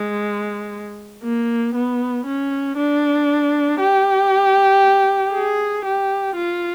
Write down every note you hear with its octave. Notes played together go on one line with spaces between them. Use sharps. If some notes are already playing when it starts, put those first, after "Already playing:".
Already playing: G#3
A#3
B3
C#4
D4
G4
G#4
G4
F4